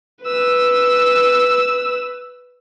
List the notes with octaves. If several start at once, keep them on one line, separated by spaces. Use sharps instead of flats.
B4 E6